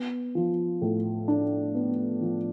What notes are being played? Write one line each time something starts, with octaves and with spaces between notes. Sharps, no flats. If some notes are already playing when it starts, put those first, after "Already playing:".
Already playing: B3
F3
A2
D4
B3
F3